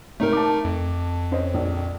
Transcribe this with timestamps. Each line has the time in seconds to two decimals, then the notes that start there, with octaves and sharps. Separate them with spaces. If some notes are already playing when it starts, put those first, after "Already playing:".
0.20 G#2 C3 A3 D#4 A#4
0.32 A5 D6
0.65 F2
1.31 C#4 C5 D#5
1.54 A#1